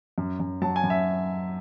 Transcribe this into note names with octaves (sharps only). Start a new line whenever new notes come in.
F#2
F#2
F#3 A5
G#5
F#2
E5